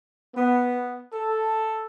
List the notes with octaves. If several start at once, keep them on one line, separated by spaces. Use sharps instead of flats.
B3
A4